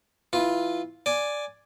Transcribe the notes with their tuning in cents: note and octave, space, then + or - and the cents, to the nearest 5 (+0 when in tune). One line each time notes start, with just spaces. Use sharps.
E3 -10 F4 +0
D5 +0 G#5 +0